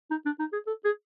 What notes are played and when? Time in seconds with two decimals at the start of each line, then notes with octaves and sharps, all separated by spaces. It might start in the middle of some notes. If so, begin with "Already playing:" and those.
0.10 D#4
0.26 D4
0.39 D#4
0.53 G#4
0.67 A4
0.85 G#4